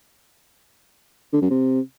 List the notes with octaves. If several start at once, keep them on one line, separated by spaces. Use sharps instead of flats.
D3
F#2
C3